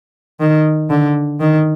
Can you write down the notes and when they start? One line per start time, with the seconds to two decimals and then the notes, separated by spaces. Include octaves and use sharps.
0.40 D#3
0.90 D3
1.41 D#3